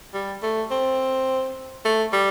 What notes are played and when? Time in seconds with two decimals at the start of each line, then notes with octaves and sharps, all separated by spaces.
0.14 G3
0.43 A3
0.71 C4
1.85 A3
2.13 G3